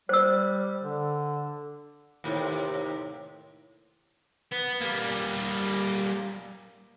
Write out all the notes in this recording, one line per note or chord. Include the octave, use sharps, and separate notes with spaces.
G3 C5 E6
D3
D#2 A2 C3
B3
G3 A#3